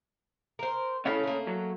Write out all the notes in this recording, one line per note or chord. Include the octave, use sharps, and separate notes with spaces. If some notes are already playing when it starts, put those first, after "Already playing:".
A#4 C5
A3 C#4 E4 F5
A3 A#3
F#3